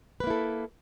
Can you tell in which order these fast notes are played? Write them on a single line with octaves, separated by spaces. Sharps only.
B4 A#3 E4 A4